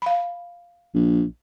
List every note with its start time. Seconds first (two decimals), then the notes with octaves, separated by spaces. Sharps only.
0.02 F5 B5
0.94 A#1